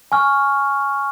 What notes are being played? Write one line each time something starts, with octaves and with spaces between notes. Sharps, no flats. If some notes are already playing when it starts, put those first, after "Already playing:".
G#5 C#6 F6